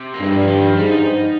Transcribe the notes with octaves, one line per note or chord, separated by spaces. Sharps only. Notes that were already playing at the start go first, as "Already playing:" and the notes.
Already playing: C3
A#3
G2 G#3
G3
F3
D#3
G3
F3
G#2 G3
D#4